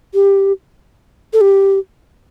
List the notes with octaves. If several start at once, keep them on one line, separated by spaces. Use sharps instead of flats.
G4
A4
G4